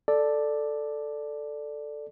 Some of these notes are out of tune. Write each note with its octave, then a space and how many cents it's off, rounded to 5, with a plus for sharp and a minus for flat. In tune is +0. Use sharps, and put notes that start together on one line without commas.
A4 +0 D5 +5